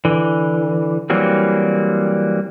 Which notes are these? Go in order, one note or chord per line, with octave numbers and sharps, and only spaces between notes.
D3 E3
E3 F#3 G3 A#3 C4